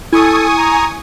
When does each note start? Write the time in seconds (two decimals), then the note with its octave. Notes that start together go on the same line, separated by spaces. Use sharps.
0.13 E4 A4 G#5 C#6 D#6
0.57 A#5